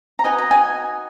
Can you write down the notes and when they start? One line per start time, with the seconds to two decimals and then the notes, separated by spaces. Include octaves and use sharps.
0.19 A#5
0.24 D#4 F#4 B4 D#5 G#5
0.38 A#5
0.51 G#5